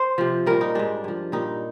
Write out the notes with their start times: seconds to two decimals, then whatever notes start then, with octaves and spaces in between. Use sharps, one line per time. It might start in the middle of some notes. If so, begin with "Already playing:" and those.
Already playing: C5
0.18 C3 F3
0.46 A#2 G3 A#4
0.61 D#4
0.75 G#2 G3 D4
1.04 G2 F3
1.32 A#2 G3 D#4